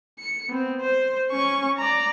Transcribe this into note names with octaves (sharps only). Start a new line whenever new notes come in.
C#7
B3 C4
C5
C#4 C#6
D5 A#5